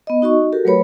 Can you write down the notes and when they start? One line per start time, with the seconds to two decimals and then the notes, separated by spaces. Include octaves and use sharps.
0.07 B3 D#5
0.22 D#4 F#4 D#5 C#6
0.53 F#4 G4 A4 A#4
0.65 F#3 A3 B4 C#5 B5